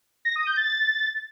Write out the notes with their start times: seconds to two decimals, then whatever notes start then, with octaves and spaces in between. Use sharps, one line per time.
0.25 A#6
0.36 D#6
0.46 G6
0.57 A6